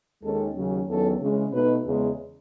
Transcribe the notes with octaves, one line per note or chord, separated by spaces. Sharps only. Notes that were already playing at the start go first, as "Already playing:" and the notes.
D#2 D#3 G#3 C#4 A4
D#2 C#3 F#3 C#4
E2 D#3 F#3 C#4 A4
C#3 E3 G#3 C#4
B2 A3 D#4 B4
E2 C#3 G#3